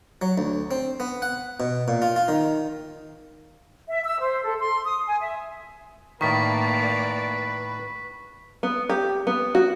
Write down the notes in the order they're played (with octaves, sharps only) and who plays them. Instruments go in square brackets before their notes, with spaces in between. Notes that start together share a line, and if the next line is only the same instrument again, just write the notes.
[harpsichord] F#3
D2
C4
B3
F#5
B2
A#2
F4
F4
D#3
[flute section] E5
E6
C5
A4
C6
D#6
G#5
E5
[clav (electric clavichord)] A2 D#3 [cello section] A#3 D5 [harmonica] B4 [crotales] C#6 B6
[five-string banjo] B3
G4
B3
F#4